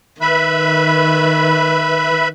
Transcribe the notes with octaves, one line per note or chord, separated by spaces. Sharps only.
D#3 B4 E5 B5